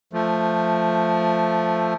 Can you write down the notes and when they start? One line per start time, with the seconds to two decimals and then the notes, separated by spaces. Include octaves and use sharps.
0.13 F3 A3